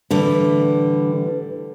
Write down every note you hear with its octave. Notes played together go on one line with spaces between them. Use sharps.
A2 D3 E3 G3